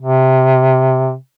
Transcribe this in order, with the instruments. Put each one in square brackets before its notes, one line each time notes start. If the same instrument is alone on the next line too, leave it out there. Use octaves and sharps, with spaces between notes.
[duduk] C3